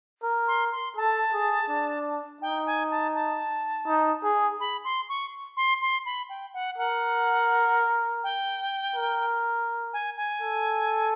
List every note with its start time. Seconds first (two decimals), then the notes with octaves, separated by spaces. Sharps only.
0.23 A#4
0.47 C6
0.72 C6
0.97 A4 A5
1.33 G#4
1.69 D4
2.42 D#4 G5
2.66 G#5
2.91 A5
3.14 A5
3.88 D#4
4.24 G#4
4.60 B5
4.84 C6
5.09 C#6
5.57 C6
5.81 C6
6.05 B5
6.29 G5
6.54 F#5
6.78 A#4 F#5
8.24 G5
8.96 A#4
9.93 G#5
10.17 G#5
10.42 A4